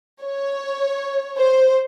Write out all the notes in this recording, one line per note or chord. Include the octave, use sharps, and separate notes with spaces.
C#5
C5